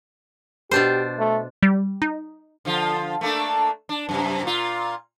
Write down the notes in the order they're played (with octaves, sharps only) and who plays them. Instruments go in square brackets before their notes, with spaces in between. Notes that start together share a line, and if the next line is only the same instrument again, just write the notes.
[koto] B2 D4 C5 [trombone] G4
[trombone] A3
[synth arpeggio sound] G3
D#4
[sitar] D3 F3 F4
A3 A#3 D4
D4
F#2 C3
A#2 F4